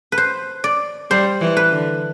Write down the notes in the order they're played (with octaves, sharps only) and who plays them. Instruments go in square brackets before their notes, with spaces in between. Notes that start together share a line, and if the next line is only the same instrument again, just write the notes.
[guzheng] B4
C5
D5
[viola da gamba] G3 [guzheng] C5
[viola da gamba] E3
[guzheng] B4
[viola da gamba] D3